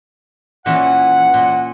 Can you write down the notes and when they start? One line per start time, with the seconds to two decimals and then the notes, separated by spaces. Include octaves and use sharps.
0.66 A#2 E3 C#4 F#5
1.34 A#2